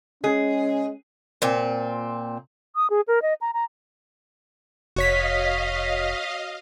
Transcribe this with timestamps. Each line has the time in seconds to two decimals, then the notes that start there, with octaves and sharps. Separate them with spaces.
0.24 G#3 C#4 G#4
1.42 A#2 C4
2.76 D#6
2.90 G#4
3.08 A#4
3.22 D#5
3.41 A#5
3.54 A#5
4.96 F1 F#4 C#5 D#5 F5 B6